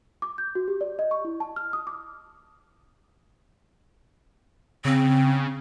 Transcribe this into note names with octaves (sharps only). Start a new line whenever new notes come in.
D6
G6
F#4
G4
D5
D#5
C#6
E4
A5
F6
D#6
D6
C#3 C4